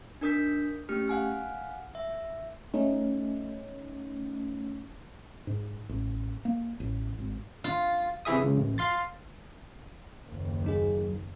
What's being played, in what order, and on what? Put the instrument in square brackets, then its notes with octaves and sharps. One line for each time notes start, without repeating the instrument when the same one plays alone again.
[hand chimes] D4 D#4 A#4 D#6 G6 B6
A3 C#4 G4 F6
F5 F#5 G#5 F6
E5
[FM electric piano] A3 C#4 D#4
[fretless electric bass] G#2
A1
A#3
A1
G#1
[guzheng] F4
[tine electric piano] C3 E3 E4 G#4 E5 D#6
C#2 C#3
A1
F5 C6 A6
[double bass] F#1 D#2
[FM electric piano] F#3 D#4 G#4